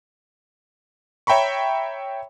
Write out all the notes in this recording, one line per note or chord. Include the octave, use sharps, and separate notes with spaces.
C#5 E5 G5 A#5 B5 C#6